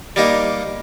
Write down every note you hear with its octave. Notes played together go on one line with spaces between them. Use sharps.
G3 A#3 D#4